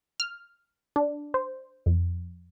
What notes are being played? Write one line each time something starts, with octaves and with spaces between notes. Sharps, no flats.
F6
D4
C5
F2